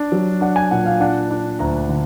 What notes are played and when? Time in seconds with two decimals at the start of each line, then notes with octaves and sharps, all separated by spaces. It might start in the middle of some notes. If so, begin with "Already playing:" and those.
Already playing: D4
0.12 F#3
0.41 D4 F#5
0.56 G#5
0.71 A#2 F#5
0.86 F5
1.00 D4 F#5
1.31 D4
1.59 D2 A#5
1.89 D3